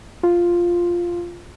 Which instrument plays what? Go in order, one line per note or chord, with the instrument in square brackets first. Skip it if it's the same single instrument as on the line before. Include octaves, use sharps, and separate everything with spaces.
[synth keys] F4